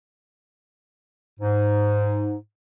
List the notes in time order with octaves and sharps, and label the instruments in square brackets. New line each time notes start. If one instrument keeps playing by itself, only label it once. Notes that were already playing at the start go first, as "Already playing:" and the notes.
[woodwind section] G#2